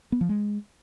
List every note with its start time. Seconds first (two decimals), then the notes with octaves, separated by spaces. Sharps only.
0.12 B3
0.21 F3
0.29 G#3